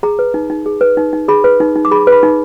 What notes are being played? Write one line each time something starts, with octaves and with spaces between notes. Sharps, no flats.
G#4 A#5
B4
D#4
D#4
G#4
B4
D#4
D#4
G#4 B5
B4
D#4
D#4
D6
G#4 B5
B4
B5
D#4